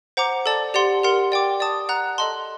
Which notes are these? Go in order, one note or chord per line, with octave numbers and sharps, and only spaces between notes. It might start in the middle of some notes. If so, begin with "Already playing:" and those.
C5 F#5 A#5 D6
A4 D5 A5
G4 D5 F#5 C6
G4 A#4 F#5 C6
D5 G5 D6
D5 A5 D#6
F#5 A#5 F#6
A4 D#5 A5 C6